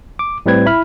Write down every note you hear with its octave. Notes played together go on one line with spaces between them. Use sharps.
D6
A2 G3 C4 B4 G#6
E4 B5 F6